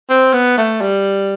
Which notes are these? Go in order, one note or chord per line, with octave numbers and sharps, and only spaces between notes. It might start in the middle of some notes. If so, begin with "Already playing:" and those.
C4
B3
A3
G3